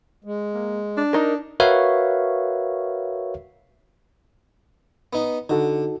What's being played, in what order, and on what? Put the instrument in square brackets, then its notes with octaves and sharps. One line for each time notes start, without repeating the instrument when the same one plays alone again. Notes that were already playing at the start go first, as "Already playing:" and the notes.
[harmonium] G#3
[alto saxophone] A#3
D4
[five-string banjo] D#4 A#4
[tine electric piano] F#4 A#4 B4 C#5 E5 F5
[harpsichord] B3 D#4
[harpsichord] D3 [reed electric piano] D#4 F#4 A4